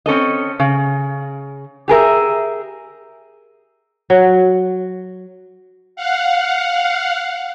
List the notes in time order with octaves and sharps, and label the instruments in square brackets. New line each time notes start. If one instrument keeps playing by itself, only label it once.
[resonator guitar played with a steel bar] C4 C#4 A4 D#5
C#3
G4 G#4 A#4 E5
[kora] F#3
[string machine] F5 F#5